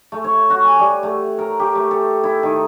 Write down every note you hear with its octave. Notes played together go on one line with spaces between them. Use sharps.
A3
C#5
F#4
G#5
G3
A3
A#4
G4
A3
A4
E4
D#3